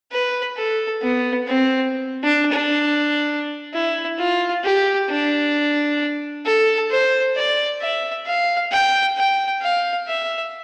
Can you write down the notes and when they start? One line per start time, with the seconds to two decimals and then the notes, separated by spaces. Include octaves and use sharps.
0.12 B4
0.57 A4
1.02 B3
1.47 C4
2.23 D4
2.53 D4
3.74 E4
4.19 F4
4.64 G4
5.10 D4
6.46 A4
6.91 C5
7.36 D5
7.81 E5
8.26 F5
8.72 G5
9.17 G5
9.62 F5
10.08 E5